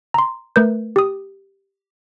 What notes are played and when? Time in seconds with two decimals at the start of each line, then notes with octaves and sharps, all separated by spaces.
0.14 A#5 C6
0.56 A3 A#4 B4 G6
0.96 G4 D#6